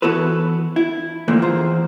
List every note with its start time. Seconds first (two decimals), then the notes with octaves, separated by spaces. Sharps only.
0.02 E3 B3 F#4 A4 B4
0.76 E4
1.28 A#2 D3 E3 F3 A3 A#3
1.42 E2 F4 C5 A#5